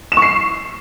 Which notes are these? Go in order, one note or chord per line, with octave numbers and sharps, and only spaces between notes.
E7
C#6
C7